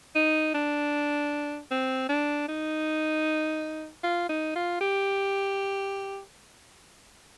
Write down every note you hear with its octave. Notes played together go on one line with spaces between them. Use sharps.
D#4
D4
C4
D4
D#4
F4
D#4
F4
G4